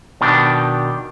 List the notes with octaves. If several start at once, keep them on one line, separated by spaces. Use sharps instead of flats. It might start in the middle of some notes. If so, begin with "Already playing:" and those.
B2 D#3 D4 G4